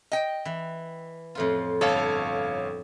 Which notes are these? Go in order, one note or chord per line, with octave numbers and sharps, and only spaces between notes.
D#5 G5
E3
F2 A2 F4
G1 A4 C#5 F5